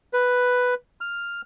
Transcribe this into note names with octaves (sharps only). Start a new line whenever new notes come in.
B4
F6